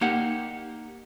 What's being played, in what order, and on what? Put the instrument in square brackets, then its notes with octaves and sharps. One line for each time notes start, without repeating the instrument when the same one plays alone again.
[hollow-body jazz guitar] A#3 D#4 G4 F#5